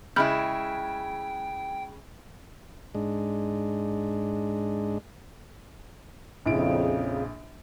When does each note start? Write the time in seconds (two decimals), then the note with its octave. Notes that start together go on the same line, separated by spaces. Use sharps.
0.16 C#3 G#3 E4 G5 B5 F6 G6
2.95 G#2 G#3 D4
6.46 A#1 F2 C#3 E4 D7